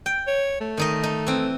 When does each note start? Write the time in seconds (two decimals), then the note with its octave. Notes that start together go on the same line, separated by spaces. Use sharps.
0.06 G5
0.27 C#5
0.61 A3
0.77 D#3 D#4 D#5
1.03 D#4
1.27 E3 C4